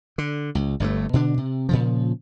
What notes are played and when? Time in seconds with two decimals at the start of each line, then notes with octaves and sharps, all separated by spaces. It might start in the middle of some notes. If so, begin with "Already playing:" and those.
0.18 D3
0.55 C#2
0.80 G1 G2 D3 A3
1.13 B2 D3 D4
1.38 C3
1.69 A#2 C#3 F3